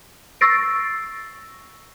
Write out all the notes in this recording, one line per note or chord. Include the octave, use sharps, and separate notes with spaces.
C#6 E6 A6 A#6 C7 D7